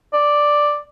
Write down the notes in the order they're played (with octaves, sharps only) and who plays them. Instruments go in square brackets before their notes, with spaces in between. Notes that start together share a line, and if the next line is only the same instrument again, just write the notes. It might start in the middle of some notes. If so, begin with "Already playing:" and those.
[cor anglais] D5